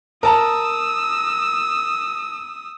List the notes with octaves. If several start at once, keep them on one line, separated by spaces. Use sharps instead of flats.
A#4 A5 A#5 D#6 E6